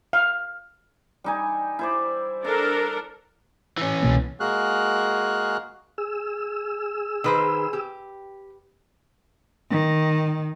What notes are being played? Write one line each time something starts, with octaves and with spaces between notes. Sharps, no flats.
F5
G3 D#4 G#5
E4 C5 D5
D4 A4 A#4 E5
E3 C#4
C2 B2 A#3
G#3 A#3 F#4 G#4 F6 F#6
G#4 E6
D#3 B4 C5
G4
D#3